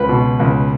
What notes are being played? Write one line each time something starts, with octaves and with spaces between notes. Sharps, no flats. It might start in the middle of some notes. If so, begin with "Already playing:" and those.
Already playing: C#2 B4
B2
C#2